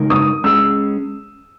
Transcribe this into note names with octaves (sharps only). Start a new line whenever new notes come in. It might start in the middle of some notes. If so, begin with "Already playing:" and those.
Already playing: C#3 G#3 D#4 A#4
D#6
G#3 C#4 G#4 E6